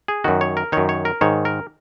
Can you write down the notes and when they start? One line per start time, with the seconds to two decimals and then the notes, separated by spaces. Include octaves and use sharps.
0.08 G#4
0.24 F#2 D#3 F#4
0.41 C#5
0.57 A#4
0.72 F#2 D#3 C#5
0.89 C#5
1.05 A#4
1.21 G#2 D#3 C#5
1.45 A#4